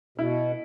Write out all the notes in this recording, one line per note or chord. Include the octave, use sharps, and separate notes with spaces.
B2 E4